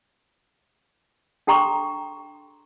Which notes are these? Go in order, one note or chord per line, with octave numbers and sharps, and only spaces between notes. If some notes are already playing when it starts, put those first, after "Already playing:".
D4 A4 G5 A#5 C6 C#6